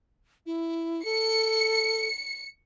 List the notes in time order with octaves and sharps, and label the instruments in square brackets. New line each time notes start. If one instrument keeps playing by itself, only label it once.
[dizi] E4
[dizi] A4 [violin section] C#7